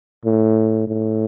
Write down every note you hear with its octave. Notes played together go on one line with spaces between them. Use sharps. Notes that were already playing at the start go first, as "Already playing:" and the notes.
A2
A2